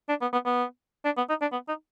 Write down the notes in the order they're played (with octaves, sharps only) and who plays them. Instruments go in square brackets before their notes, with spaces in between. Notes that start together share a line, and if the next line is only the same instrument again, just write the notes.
[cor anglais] D4
B3
B3
B3
D4
B3
D#4
D4
B3
D#4